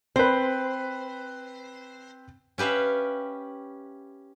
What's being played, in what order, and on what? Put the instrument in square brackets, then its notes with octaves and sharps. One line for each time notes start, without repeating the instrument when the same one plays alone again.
[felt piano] C4 B4 [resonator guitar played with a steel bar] C5
[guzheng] C#4 G4 B4 E5 F5